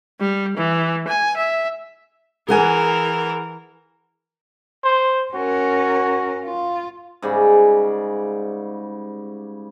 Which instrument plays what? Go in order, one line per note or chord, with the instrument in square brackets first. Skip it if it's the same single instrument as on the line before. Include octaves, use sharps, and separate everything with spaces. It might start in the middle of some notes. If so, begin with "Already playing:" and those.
[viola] G3
E3
G#5
E5
[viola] E3 A#4 [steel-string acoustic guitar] G#4 F#5 G#5
[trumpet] C5
[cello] C#4 A#4 [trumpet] F#4
[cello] F4
[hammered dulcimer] G#2 C#3 G3 D5